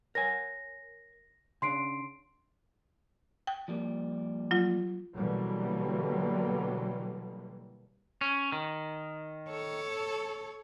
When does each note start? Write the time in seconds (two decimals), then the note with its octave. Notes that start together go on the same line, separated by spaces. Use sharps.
0.15 A#4 C#5 G#5 A#6
1.62 C#3 D4 C6 C7 D7
3.47 G5
3.68 F3 G3 A#3
4.51 F#3 F4
5.16 B2 D3 E3 F#3 G3 A#3
8.21 C#4
8.52 D#3
9.49 A4 C#5